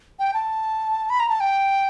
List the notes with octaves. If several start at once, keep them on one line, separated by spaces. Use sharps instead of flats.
G5
A5
B5
A#5
A5
G5